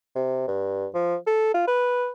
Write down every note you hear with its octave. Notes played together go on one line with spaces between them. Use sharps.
C3
G2
F3
A4
F4
B4